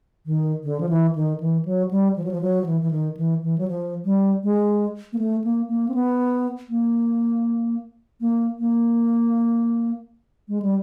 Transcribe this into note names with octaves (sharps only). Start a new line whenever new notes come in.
D#3
D3
F3
E3
D#3
E3
F#3
G3
F3
F#3
F3
F#3
F3
E3
E3
D#3
E3
E3
F#3
F3
G3
G#3
A#3
A3
A#3
A#3
C4
B3
A#3
A#3
A#3
G#3
G3